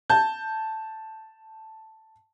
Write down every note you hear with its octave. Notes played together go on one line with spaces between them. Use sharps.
A5 G6